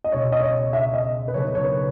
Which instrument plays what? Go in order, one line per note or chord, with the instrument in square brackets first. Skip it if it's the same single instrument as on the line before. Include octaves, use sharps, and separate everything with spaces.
[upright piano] D#5
[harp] C#2 B2 G#3 C#4 G#4 [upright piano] C#5
[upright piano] D#5
C#5
E5
D#5
B4
[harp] C#3 F#3 B3 D#4 A4 [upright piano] C#5
[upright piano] C#5
B4